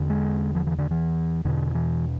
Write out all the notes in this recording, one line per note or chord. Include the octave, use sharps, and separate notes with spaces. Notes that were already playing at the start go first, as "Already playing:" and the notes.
Already playing: E2 D3
G#3
F3
E3
D3
E3
E2 B2 D3
E3